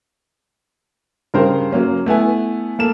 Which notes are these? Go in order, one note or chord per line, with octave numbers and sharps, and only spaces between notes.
G2 C#3 A#4 C5 G5
F#3 A#3 C#4
A3 B3 E4 G#5
A#3 A4 E7